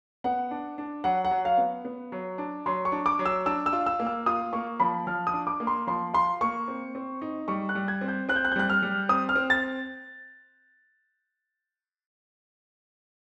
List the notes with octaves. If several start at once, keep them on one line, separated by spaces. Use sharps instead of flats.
B3 F#5
D4
D4
F#3 F#5
F#5
F#3
F5
B3
B3
F#3
D4
F#3 C6
C#6
D4
D6
F#3
E6
D4 E6
E6
F4
E6
A#3
E6
F4 D#6
A#3 C#6
F3 B5
F3 F6
D#6
D4
D6
A#3
C6
F3 C6
F4 C6
A#3 C#6
C4
C4
D#4
G3 C#6
F#6
G3
G#6
C4
G6
C4 F#6
G6
F#6
G6
G3 F#6
F6
G3
C4 D#6
F6
C4
A6